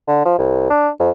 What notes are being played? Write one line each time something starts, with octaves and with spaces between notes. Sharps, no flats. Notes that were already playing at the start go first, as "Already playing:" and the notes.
D3
F3
C2
D4
F2